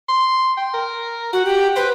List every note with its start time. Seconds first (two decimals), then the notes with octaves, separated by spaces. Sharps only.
0.09 C6
0.57 G5
0.74 A#4
1.33 F#4 F#5
1.45 G4
1.76 B4 C5